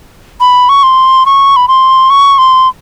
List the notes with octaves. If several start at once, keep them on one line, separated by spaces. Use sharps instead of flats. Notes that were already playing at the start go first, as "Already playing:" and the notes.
B5
C#6
C6
C#6
B5
C6
C#6
C6